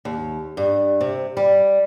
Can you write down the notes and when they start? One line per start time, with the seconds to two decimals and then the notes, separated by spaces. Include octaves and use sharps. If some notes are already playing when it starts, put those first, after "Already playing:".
0.05 D#2
0.57 G2
1.01 C3
1.37 G3